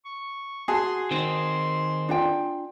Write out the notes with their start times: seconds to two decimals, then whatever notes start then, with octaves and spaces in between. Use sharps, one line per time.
0.05 C#6
0.68 F#4 G#4 A5 C6
1.11 D#3 C4 C6
2.09 D4 F4 G5